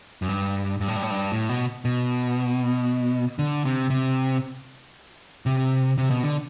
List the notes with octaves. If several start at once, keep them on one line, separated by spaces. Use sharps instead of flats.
F#2
G2
G2
A2
G2
A2
G2
A2
B2
B2
D3
C3
C3
C3
C3
B2
D3